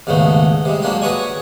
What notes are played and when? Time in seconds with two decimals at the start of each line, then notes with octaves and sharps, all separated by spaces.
0.07 D#2 G#2 C#3 A3 B3
0.65 C3 G3 G#3
0.82 F#3 G#3 A#3 D4 G4
1.02 F#4 G#4 B4 C#5 D5 G#5